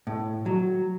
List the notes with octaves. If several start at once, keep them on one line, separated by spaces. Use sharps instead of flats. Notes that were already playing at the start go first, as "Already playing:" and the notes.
A2
F#3